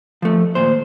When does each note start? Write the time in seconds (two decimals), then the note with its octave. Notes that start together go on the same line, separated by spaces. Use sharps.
0.22 F3 A3
0.55 D#2 A#2 C5